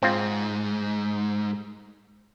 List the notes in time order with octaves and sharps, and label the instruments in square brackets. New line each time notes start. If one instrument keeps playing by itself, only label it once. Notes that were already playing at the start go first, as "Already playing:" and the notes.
[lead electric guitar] G#2 [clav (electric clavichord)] C4 F4